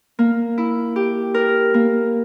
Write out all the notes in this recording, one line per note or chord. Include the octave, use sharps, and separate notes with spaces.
A#3
E4
G4
A#4
A#3